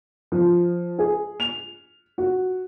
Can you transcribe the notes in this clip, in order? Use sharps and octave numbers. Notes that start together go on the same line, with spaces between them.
F3
G#4
F7
F#4